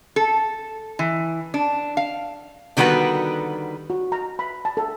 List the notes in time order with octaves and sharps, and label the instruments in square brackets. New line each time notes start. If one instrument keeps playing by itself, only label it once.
[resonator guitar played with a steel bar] A4
E3
D4
F5
D3 D#3 G3 B3 F#4 B4
[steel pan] F#4
A#5
B5
A5
A4